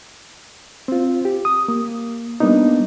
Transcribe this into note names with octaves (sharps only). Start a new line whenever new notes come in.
C4 F4
G4
D#6
A#3
G3 A#3 B3 D4 D#4